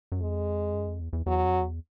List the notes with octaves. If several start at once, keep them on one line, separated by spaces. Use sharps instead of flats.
F#2
F2 G#3
F#2
F2
E2
E2
E2 F#3
F2
E2